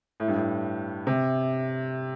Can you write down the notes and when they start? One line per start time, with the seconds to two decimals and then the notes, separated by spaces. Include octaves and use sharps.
0.20 A2
0.28 G2
0.36 A2
1.07 C3